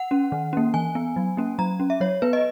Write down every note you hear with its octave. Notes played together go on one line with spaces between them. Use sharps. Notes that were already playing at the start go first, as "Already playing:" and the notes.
Already playing: F#5
C#4
D#3
A#3 C#4
E3 G#5
B3
F#3
A#3 C#4
F#3 A#5
C#4
E5
F#3 C#5
B3 B4
D#5